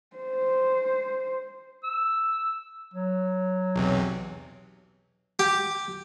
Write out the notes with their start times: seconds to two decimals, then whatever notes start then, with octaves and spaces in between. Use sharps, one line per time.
0.16 C5
1.84 E6
2.94 F#3
3.75 B1 E2 C3
5.39 G4